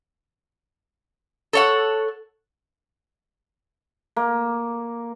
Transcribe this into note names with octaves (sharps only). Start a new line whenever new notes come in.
A4 C#5 F#5
A#3